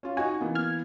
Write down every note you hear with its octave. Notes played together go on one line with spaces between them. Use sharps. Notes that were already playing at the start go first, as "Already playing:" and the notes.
C#4 F4
D#4 F#4 G#5
E3 A#3 B3
F6 G#6